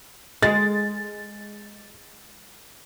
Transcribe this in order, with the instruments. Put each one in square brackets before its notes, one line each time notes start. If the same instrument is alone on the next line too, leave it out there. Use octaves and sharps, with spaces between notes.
[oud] G#3 [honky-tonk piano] A6